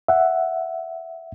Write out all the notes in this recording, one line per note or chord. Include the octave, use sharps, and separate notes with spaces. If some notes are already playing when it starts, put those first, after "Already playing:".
E5 F#5